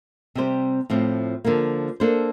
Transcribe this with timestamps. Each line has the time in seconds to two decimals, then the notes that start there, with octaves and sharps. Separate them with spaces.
0.35 C3 G3 C4 G4 C5
0.90 A2 F3 C4
1.45 D3 F3 A#3
2.00 A#3 D4 A4 C5